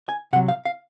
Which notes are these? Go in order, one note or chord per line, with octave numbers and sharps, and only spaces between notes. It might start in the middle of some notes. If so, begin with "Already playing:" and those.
G#5
C3 F#3 F#5
F5
F5